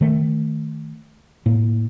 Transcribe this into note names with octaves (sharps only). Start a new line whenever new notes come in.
D#3 A3
A2 A#3